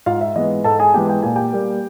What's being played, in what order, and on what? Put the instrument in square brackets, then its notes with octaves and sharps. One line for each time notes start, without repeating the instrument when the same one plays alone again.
[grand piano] G#2 F4 F5
E5
E3 G#3 B3 D#5
G#2 A4 A5
G#4 G#5
E3 G#3 B3 G4 G5
G5
A#2 G#5
G4 G5
G3 A#3